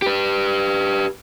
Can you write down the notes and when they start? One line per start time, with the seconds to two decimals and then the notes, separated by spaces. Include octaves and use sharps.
0.02 G4 B4